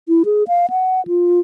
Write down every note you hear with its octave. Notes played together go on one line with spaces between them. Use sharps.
E4
G#4
F5
F#5
F4